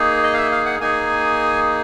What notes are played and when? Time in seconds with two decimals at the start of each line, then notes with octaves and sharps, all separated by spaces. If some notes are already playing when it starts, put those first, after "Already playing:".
Already playing: A#3 D#4 G#4
0.23 D#5
0.34 F5
0.37 E5
0.52 F5
0.66 F#5
0.80 A#3 D#4 G#4 G#5